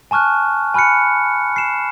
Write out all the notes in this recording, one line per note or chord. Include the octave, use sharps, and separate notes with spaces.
G#5 A5 C#6 F6 F#6
G#5 B5 F6 F#6 C#7
C7 E7